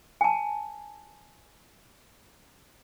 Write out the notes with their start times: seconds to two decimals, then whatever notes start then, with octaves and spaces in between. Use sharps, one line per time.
0.21 G#5 A5